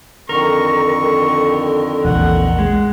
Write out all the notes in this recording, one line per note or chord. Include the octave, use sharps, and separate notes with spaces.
F2 D3 D#3 A#4 C#6
A#1 E2 F#5
G#3